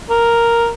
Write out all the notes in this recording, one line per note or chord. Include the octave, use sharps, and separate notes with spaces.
A#4